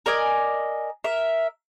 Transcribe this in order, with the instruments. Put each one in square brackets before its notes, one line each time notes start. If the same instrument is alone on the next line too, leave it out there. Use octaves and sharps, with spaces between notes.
[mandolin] A#4 D5 D#5 G#5
A#4 E5